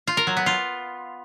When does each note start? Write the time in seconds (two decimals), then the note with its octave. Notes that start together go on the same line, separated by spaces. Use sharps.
0.07 F4
0.17 A#4
0.27 F#3
0.37 B3
0.46 F4